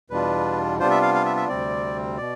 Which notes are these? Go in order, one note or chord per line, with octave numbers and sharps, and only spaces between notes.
E2 B2 G3 D4 F4 B4
C3 G3 B3 D4 F4 C5
E5
F5
F5
E5
E5
D2 C3 G3 C4 D5
B2 D5